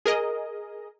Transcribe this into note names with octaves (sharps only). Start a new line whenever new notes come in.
G#4 A#4 D#5